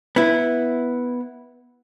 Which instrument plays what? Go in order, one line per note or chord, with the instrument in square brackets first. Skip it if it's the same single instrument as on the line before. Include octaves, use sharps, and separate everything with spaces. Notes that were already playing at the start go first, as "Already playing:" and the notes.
[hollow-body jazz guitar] B3 E4